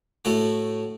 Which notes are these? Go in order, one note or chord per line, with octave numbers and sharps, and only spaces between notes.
A2 A3 F#4